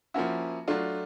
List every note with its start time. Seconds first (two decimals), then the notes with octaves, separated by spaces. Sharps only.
0.14 F3 A#3 C#4 E4 F#4
0.68 F#3 A3 D4 F4